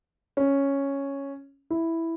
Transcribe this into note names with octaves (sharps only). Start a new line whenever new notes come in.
C#4
E4